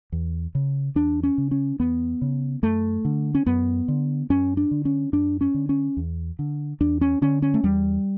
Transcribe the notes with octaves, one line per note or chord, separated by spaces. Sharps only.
E2
C#3
E2 D4
C#4
C#3
C#4
E2 B3
C#3
F#2 A3
D3
C#4
F#2 B3
D3
F#2 C#4
D4
D3
C#4
F#2 D4
C#4
D3
C#4
E2
D3
E2 D4
C#4
D3 C#4
C#4
A3
E2 G3